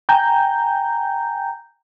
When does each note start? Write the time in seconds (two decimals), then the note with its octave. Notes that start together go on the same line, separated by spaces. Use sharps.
0.09 G5 G#5 A#5 G6